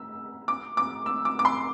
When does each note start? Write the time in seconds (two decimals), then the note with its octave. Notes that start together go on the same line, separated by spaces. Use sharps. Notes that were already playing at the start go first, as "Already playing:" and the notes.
Already playing: E6
0.48 D6
0.77 D6
1.06 E6
1.25 D6
1.39 D6
1.45 C6